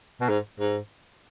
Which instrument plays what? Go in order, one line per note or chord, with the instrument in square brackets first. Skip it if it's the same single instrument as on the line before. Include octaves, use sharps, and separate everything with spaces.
[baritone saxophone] B2
G#2
G#2